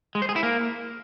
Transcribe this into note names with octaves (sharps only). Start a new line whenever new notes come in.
G#3
C5
G#4
E4
A#3